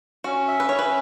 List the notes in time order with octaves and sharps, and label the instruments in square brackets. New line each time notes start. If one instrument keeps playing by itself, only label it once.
[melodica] C#4 [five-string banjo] F#4
[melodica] E5
[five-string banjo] B4
[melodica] C#4 [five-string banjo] C#5
[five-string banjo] B4